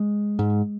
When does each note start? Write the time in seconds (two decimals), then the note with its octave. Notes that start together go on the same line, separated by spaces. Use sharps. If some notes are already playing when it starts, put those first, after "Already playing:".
Already playing: G#3
0.39 G#2